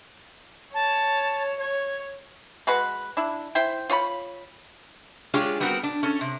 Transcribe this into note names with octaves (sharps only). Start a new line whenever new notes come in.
C#5 A5
C#5 G#6
G#3 F#4 B4
D4 E4
E4 C5 G5
F4 C#5 G5 B5
G#3 D4 F4 G4 G#4 C#5
G3 B3 C4 F#4 A#4
D4
C#4 A4
C3